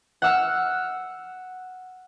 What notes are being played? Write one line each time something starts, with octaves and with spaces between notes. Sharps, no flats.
F#5 E6 F6